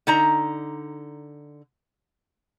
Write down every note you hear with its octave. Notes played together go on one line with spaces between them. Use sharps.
D3 D#4 A#5